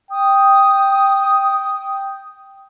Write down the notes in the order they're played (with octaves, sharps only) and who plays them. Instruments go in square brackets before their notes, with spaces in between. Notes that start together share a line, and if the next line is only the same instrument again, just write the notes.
[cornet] G5 [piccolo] D#6